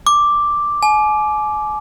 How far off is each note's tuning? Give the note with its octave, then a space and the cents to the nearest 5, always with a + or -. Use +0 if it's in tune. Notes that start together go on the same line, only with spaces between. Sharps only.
D6 +0
G#5 +40